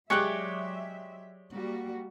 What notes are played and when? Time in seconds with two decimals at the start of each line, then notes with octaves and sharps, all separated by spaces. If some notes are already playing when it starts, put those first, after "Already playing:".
0.10 F#3 G#3 G4 C#5 D5 E5 F#6
1.51 G3 A#3 F#4